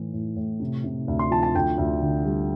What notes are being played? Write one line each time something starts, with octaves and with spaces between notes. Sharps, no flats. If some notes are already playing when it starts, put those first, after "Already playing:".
Already playing: A2 E3
A2
A2
C3
C3
D2
C6
F3 A5
A5
D2 G5
D2
D3
G3